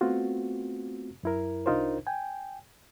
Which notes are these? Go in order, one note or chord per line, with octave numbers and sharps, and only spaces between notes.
A3 B3 C4 F4 F#4
F#2 E4 A#4
C2 D4 D#4 F4 A#4 C5
G5 G#5